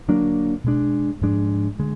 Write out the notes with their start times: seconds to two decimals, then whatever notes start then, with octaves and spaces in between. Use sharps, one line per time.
0.08 D3 F#3 A#3 D4
0.64 B2 G#3 D4
1.21 G#2 F3 G#3 D4
1.79 D3 G#3